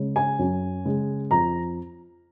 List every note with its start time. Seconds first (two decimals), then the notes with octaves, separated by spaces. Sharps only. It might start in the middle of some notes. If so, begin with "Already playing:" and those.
Already playing: C#3 G#3
0.16 G#5
0.39 F#2
0.85 C#3 G#3
1.31 F2 A#5